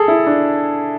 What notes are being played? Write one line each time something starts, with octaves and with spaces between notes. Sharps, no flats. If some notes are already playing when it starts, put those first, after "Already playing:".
Already playing: G#4 A4
E4
D4